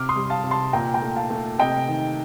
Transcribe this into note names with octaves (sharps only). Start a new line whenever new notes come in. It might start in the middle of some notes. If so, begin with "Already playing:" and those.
Already playing: C3 D6 F6
C6 D#6
G3
F5 A5
C3
A5 C6
A#2 G5 A#5
G5 A#5
A3
F5 A5
A3
C3 D#5 G5
D#3